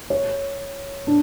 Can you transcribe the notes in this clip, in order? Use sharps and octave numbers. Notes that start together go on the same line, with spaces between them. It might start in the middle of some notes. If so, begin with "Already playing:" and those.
C#5
D4